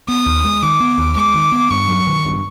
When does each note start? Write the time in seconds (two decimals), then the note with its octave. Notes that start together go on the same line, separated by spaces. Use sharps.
0.08 B3 D#6
0.26 D#2
0.44 G#3
0.62 D#3 D6
0.80 B3
0.98 D#2
1.16 G#3 D6
1.34 D#3
1.52 B3
1.71 G2 C#6
1.88 F#3
2.07 D#3
2.25 G2